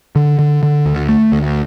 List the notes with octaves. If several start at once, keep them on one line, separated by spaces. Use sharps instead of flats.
D3
D3
D3
D2
A3
D2